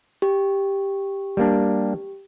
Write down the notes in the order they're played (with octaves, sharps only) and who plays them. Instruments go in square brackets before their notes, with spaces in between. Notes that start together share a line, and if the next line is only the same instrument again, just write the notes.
[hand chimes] G4
[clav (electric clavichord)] G3 A#3 D4